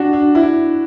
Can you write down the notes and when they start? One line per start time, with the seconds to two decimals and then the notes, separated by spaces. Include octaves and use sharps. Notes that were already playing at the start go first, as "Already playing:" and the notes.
Already playing: D4 F#4
0.13 D4
0.35 E4